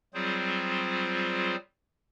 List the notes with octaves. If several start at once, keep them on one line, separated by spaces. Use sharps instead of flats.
F#3 G3 C4 F4 G#4 C5